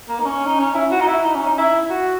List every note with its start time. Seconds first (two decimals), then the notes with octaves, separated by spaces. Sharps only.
0.08 A#3
0.19 D#4
0.25 C#4
0.46 D#4
0.59 C#4
0.74 E4
0.91 F#4
1.01 D#4
1.07 E4
1.24 D#4
1.35 C#4
1.46 D#4
1.58 E4
1.90 F#4